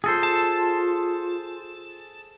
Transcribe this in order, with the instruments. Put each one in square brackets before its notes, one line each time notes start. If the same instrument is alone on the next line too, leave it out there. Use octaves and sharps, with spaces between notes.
[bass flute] F4 [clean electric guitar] G#4 A4 C5
[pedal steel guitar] A5